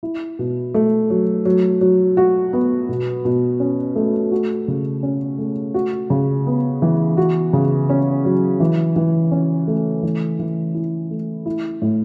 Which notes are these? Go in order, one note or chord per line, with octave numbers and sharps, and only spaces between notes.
E4
B2
A3
F#3
F#3
F#3
F#4
B3
B2
B2
C#4
A3
F#4
C#3
C#4
A3
F#4
C#3
B3
E3
F#4
C#3
C#4
F#3
E3
E3
C#4
A3
E3
E3
E4
A3
E4
A2